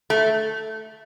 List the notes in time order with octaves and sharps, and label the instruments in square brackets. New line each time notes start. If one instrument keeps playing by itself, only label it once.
[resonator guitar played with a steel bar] A3